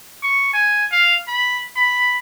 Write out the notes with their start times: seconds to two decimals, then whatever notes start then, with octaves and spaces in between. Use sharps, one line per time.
0.23 C#6
0.53 G#5
0.92 F5
1.28 B5
1.76 B5